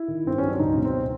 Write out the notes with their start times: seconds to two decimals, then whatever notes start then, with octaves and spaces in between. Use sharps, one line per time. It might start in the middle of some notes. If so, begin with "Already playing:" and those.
Already playing: E4
0.08 D#3
0.25 G2 C4
0.38 F#3 C#4
0.49 D4
0.59 C#2 D#4
0.76 B2
0.85 C4